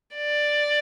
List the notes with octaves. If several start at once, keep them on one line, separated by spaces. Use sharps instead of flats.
D5